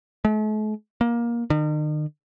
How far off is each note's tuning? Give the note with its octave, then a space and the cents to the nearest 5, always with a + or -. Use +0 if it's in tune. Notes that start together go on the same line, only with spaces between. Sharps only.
A3 -45
A#3 +20
D#3 -40